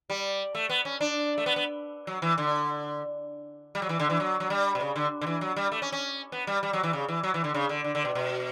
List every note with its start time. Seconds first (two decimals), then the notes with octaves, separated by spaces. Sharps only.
0.10 G3
0.55 A3
0.69 B3
0.85 C#4
1.01 D4
1.38 A3
1.46 B3
1.56 B3
2.07 F#3
2.22 E3
2.38 D3
3.75 G3
3.82 F#3
3.89 E3
4.00 D3
4.10 E3
4.20 F#3
4.40 F#3
4.50 G3
4.75 B2
4.80 C#3
4.96 D3
5.21 D3
5.27 E3
5.41 F#3
5.56 G3
5.72 A3
5.82 C#4
5.92 C#4
6.32 B3
6.47 G3
6.63 G3
6.73 F#3
6.83 E3
6.93 C#3
7.08 E3
7.23 F#3
7.34 E3
7.44 D3
7.54 C#3
7.69 D3
7.84 D3
7.95 D3
8.05 B2
8.15 B2